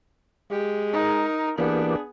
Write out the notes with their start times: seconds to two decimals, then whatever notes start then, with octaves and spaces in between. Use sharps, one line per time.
0.51 G#3 G4
0.93 D#4 A#4
1.58 E3 A#3 B3 D4 G4 G#4